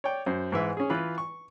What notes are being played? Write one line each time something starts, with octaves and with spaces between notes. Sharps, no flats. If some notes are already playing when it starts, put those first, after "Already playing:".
C#5 D5 G5
F#2 C5
G#2 E3 E5
C#4 G#4
E3 F4 B4
C#6